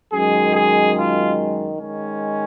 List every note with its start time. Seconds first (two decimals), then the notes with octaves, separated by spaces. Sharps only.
0.12 F#2 D#3 G#3 G#4
0.54 G#4
0.96 F4
1.79 D#3 G#3 C#4